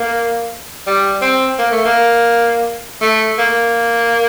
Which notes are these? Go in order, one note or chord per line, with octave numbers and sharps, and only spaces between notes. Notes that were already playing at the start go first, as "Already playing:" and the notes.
Already playing: A#3
G3
C4
A#3
A3
A#3
A3
A#3